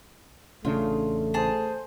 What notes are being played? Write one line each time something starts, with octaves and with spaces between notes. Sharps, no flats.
A1 C#3 A3 D4 F4
G#4 C5 A5